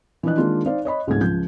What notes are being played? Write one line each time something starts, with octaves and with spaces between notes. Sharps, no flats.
E3 F3 D4 D5 D#5 F#6
D#3 G#3 A#3 D4 F4
D#4 C5 D5 F5
C#5 D#5 B5
C#2 G#2 F#3 G#3 A3 G#6
C#2 F3 G6